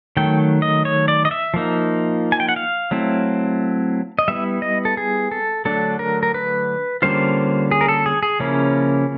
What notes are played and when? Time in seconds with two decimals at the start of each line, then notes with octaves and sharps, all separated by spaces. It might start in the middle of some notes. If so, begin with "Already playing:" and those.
0.17 D#3 F#3 A3 G5
0.62 D#5
0.85 C#5
1.08 D5
1.25 D#5
1.31 E5
1.54 F3 A#3 D#4
2.32 G#5
2.40 G5
2.49 F#5
2.56 F5
2.91 F#3 A3 C4 E4
4.19 D#5
4.28 G3 B3 E4 E5
4.62 D#5
4.85 A4
4.97 G#4
5.31 A4
5.65 D3 F#3 A3 D4 A4
5.99 A#4
6.23 A#4
6.34 B4
7.02 D3 G3 A#3 C#4 F4 C5
7.71 G#4
7.81 A#4
7.88 A4
8.06 G#4
8.23 G#4
8.40 C#3 F3 A#3 C#4 E4